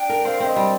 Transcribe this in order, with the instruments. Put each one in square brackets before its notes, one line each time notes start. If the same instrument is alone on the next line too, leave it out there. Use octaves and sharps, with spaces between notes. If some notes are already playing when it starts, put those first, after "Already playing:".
Already playing: [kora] D4 [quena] G5
[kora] A#4
[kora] C4 [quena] F5
[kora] C4 [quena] D#5
[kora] G3